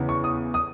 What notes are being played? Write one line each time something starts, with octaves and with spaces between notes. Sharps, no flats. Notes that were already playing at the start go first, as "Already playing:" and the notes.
Already playing: E2 C#3 E3
C#6
D#6
D#6